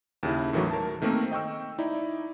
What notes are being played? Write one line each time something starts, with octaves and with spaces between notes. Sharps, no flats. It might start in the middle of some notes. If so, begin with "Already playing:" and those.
D#2 C#3 E4
A2 D#3 E3 F#3 A3 F#4
A#4 A5
D#3 A3 A#3 C4 A#4
D#5 G5 C#6 E6
D#4 E4 D5